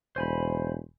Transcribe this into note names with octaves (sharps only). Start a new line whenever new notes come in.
E1 C5 G#5 B5